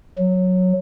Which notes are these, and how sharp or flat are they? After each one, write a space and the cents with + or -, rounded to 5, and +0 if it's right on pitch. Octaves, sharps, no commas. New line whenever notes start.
F#3 -10